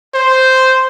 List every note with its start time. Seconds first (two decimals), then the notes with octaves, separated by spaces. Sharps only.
0.14 C5